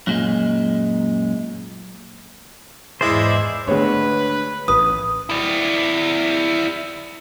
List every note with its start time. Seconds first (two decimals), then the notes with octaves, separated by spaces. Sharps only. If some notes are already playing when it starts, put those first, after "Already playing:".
0.07 F#2 A#2 G#3
3.01 E2 G#2 G#3 E4 C5 D5 E5
3.67 D2 G#3 D4 B4 C#5
4.68 A1 B4 D#6
5.30 E4 D5